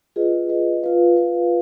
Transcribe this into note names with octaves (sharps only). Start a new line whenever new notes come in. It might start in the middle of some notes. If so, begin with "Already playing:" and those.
F4 G#4 B4 D#5
F4 G#4 B4 D#5
F4 B4 F5
F4 B4 F5